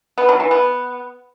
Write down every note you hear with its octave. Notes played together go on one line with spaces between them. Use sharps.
B3
F#3
E3
B3